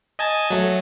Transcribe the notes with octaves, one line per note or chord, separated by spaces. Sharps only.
D#5 G#5 A5
F#3 A3